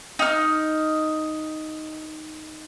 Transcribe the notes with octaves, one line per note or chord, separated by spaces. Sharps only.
D#4 F6